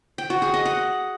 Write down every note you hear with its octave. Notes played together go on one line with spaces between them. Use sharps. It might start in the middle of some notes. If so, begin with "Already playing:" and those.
G5
F#4
G#4
D#5
F#5